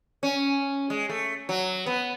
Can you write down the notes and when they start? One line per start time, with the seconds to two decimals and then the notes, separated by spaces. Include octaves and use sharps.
0.23 C#4
0.90 G#3
1.09 A3
1.49 F#3
1.86 B3